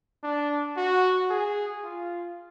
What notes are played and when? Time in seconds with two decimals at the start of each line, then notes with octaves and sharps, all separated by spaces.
0.23 D4
0.77 F#4
1.30 G#4
1.84 F4